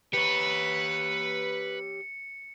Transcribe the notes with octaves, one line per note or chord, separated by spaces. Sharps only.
G4 B4 C#5 C#7